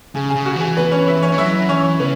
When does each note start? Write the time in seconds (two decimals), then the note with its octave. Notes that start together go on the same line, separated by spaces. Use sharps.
0.15 C#3 G#4
0.30 G#4
0.36 C#3
0.46 F#4
0.56 E3 G#4
0.77 B3 B4
0.91 C#4 C#5
1.07 E4 E5
1.22 C#4 C#5
1.32 E3
1.38 F#3 E4 E5
1.69 E3 C#4 C#5
2.00 C#3 B3 B4